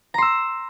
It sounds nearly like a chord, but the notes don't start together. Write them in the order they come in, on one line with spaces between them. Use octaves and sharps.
A#5 C6 E6